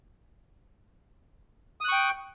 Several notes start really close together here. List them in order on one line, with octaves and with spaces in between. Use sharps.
D#6 F#6 C#6 G5